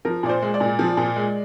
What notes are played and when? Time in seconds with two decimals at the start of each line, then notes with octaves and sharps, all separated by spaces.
0.05 F3 A#4
0.23 A#2 D5
0.29 C5
0.42 G#3
0.54 D5
0.60 A#2
0.79 F3
0.97 A#2
1.16 G#3